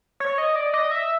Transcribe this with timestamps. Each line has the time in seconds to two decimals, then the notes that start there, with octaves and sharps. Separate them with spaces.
0.20 C#5
0.38 D#5
0.56 D5
0.74 D#5
0.91 E5